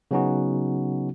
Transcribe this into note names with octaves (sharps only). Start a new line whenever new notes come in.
C#3 F#3 B3 C#4 D#4 F#4